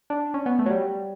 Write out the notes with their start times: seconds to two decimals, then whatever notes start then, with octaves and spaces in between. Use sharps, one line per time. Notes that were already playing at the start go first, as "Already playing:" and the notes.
0.10 D4
0.34 C#4
0.46 B3
0.59 A3
0.66 F#3
0.70 G3